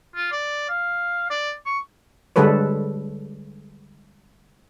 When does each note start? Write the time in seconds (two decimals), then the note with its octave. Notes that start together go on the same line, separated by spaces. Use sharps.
0.15 F4
0.32 D5
0.69 F5
1.30 D5
1.66 C#6
2.36 D3 G3 G#3 A4 B4 C#5